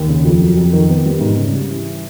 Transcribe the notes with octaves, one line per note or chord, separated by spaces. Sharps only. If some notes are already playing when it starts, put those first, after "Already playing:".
Already playing: D#2
C#3
F2
F#3
F2
D#3
B3
G3
G#2
C#3
G3
E3